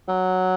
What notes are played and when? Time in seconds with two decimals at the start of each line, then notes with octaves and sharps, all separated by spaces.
0.08 F#3